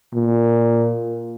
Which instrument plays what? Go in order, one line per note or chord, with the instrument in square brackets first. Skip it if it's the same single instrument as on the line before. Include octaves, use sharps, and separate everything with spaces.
[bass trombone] A#2